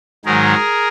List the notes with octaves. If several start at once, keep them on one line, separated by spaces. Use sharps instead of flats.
G#2 D#3 F#3 G#4 A#4